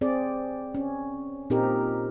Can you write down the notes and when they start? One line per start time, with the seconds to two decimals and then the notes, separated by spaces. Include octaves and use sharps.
0.01 C4 G#4 D5
0.75 C#4
1.50 A#2 C4 D#4 G4 A#4